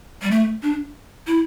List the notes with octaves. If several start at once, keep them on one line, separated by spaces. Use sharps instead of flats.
G3
A3
D4
E4